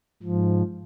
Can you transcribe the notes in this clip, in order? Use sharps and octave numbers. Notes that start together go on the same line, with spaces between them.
G#2 F3